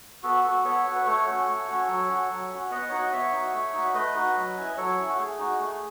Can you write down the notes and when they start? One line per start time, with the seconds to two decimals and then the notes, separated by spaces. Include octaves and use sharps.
0.23 B3 F#4 A4
0.44 F#4 A4
0.64 B3 A4 C#5
0.86 F#4
0.96 B4
1.06 A3 A4 C#5
1.27 C#4 F#4
1.47 A3
1.68 C#4 F#4
1.88 F#3
2.08 C#4 F#4
2.29 F#3
2.50 C#4 F#4
2.70 B3 D#5 F#5
2.89 D#4 F#4 C#5
3.01 D#5
3.12 B3 C#5 E5
3.32 D#4 F#4
3.53 A3
3.73 D#4 F#4
3.94 A3 B4 D#5
4.15 D#4 F#4
4.36 F#3
4.57 C#4 E4
4.77 F#3 A4 C#5
4.97 C#4 E4
5.09 F#4
5.18 A3 G#4
5.39 D#4 F#4
5.59 A3